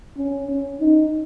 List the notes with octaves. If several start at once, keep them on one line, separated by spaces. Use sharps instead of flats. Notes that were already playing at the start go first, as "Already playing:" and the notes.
C#4
C#4
D#4